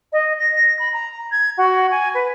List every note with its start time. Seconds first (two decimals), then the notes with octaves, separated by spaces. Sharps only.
0.12 D#5
0.39 A#6
0.79 B5
0.93 A#5
1.31 G#6
1.57 F#4
1.91 G#5
2.14 B4